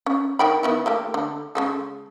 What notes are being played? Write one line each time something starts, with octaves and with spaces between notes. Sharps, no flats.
C#4
D#3 G5 B5
D#3 B3 E4
A3 A#3 G4
D3
C#3 G#3 A4